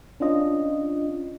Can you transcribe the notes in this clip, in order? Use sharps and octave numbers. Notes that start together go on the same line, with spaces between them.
C#4 D4 F4 D#5